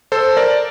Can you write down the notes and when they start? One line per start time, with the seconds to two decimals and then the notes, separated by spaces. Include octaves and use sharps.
0.12 A4 C5
0.37 A#4 D5